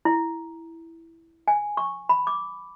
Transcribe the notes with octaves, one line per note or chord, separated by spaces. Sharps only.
E4
G#5
C#6
B5
D6